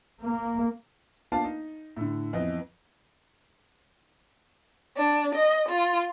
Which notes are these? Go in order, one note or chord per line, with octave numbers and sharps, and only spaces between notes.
A#3
A#3 B3 D4 F4 F5 A5
D#4
A2 D3
F2 E3 B3 D#5
D4
D#5
F4